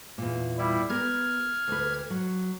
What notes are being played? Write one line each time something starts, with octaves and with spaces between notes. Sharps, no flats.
E2 A#2
G3 E4
B3 G4 A#4 F6 G#6
D2 B4
F#3